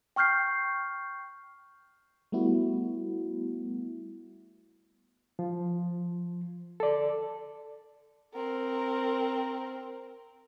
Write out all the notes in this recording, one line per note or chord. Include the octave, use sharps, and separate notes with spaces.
G5 C#6 F6 G6 C7
G3 A3 B3 E4 F#4
F3
A4 D5
C4 A#4